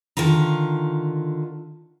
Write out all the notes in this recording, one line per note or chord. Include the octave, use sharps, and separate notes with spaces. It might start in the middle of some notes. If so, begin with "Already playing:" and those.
D3 D#3 F4 A#5